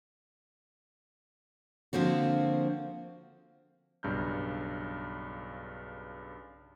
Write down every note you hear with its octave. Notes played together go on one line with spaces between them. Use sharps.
D3 F3 A#3 C4 F#4
B1 G2 C#3 A#5 F6 G6